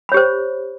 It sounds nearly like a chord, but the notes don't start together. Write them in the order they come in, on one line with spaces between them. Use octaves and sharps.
B5 C#5 G4 C5